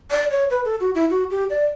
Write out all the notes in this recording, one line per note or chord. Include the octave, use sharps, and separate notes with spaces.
D5
C#5
B4
A4
F#4
E4
F#4
G4
D5